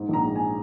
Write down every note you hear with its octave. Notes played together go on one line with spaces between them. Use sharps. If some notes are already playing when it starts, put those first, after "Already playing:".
Already playing: G#2
A#1 A#5
G#3
G#5